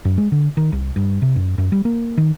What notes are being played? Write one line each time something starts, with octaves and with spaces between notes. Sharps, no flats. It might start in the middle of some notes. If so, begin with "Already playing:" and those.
F#2
G#3
D3
D#3
C2
G2
C3
F#2
F#2
G3
A#3
D#3